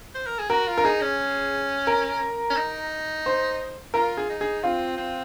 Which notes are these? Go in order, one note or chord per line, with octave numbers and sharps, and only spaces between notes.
C5
A#4
G#4
F#4 A#4
F4
A#4
D#4 G#4
C#4
A#4
C#4
D#4
C5
F4 A#4
G#4
D#4
G#4
C4 F4
C4